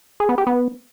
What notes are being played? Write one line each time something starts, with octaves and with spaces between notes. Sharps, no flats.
G#4
B3
G4
B3